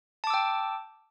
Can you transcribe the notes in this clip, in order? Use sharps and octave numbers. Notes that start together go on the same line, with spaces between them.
G5 A5 D6 E6